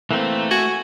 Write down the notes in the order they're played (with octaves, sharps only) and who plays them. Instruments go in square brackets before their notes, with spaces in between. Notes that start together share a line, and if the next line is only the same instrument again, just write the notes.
[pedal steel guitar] E3 A#3 C4 [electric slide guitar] A3
[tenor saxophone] F#4 [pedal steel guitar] G#5